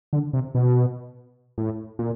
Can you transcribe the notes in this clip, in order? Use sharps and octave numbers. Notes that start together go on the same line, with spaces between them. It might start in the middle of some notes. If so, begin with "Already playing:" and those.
D3
C3
B2
A2
A#2